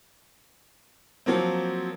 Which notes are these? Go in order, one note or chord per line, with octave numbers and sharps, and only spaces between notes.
F3 F#3 A#3 C4